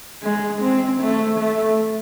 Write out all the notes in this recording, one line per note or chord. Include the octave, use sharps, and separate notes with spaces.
G#3
C4
A3
A3